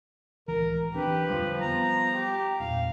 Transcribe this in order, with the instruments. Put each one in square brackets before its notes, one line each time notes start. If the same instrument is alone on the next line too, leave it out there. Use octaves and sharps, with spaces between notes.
[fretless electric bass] D1 C#2 E3 [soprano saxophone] A#4
[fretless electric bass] E3 C4 D4 [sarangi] G4 [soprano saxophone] B4
[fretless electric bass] F2 D3 G3 [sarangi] F3
[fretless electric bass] G3 B3 [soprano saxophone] A#5
[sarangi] G4
[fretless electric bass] E2 G2 A#2 [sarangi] F5